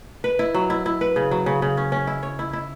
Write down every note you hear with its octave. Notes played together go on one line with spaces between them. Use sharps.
B4
E4
F#3
E4
E4
B4
C#3
F#3
C#3
C#3
C#4
C#4
E4
C#5
E4
E4